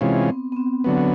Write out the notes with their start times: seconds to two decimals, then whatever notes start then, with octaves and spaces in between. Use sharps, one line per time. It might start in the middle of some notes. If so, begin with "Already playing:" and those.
0.01 C3 E3 G#3 C4 C#4 F4
0.29 B3
0.52 B3
0.57 C4
0.84 D3 F#3 B3